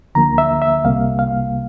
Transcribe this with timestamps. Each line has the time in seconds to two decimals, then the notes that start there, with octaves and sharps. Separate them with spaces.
0.15 D2 D3 F3 A#3 A#5
0.38 E5
0.62 E5
0.84 C2 C3 G3 A#3 F5
1.19 F5